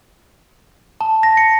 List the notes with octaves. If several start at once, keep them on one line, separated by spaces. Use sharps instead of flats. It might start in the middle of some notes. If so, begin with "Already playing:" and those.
A5
A#6
C#7